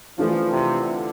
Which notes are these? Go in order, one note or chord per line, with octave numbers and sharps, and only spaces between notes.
E3 F3 A3 D4 F4
C3
D3